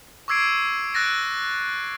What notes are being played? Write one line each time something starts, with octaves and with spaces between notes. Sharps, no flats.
C#6 D6 E6 G#6 C7 D7
E6 F#6 A6 A#6 D7